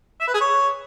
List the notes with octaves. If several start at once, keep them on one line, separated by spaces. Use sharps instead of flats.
E5
B4
G#4
C#5